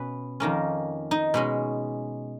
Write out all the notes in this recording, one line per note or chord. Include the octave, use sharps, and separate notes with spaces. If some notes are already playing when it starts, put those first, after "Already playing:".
Already playing: B2 C#4 B4
F2 D#3 A#3 C#4
D#4
B2 G#3 C#4